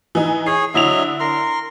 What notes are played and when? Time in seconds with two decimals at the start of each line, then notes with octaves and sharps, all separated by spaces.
0.15 E3 D#4
0.47 G#4 C#5 C7
0.74 D3 F#3 E4 D#5 E5 F7
1.20 A#4 C6